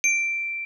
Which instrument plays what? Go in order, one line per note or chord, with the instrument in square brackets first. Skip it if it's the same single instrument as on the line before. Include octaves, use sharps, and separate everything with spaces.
[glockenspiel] D7